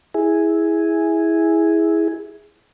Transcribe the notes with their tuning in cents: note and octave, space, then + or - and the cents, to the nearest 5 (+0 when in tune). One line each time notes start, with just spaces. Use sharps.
E4 -10 G#4 +0